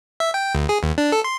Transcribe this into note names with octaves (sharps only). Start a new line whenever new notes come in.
E5
G5
D2
G#4
D#2
D4
A4
C6